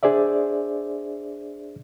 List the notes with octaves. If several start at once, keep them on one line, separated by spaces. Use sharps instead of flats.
D4 G#4 C5 D5 E5